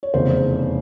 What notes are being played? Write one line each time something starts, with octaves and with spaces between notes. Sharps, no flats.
C#5
F1 E2 C#3 C5